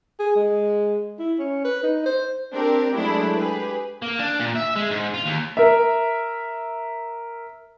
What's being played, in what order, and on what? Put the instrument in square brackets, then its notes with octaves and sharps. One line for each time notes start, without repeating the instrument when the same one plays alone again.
[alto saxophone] G#4
G#3
E4
C#4
B4
D#4
C5
[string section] C4 D4 G4 A#4
F#3 G#3 A3 D4 E4
G4 G#4 B4
[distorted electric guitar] A#3
D4
A#2
E5
G#3
G#2
F4
D#2
[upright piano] A#4 E5